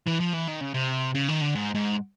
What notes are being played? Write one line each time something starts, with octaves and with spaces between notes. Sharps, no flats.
E3
F3
E3
D#3
C#3
C3
C#3
D#3
D3
G#2
G#2